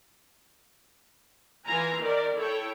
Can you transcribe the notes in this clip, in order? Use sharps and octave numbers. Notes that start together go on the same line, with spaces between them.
E3 F4 G#5 A#5
D#3 A#4 D5
E4 A4 C#5 G5